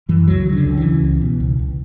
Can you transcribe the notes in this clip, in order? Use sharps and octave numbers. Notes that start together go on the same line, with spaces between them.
F#2 E3
C#2 F#3
C#3
D3
C#2
E3
C#3
C#2
B2
C#2
C#2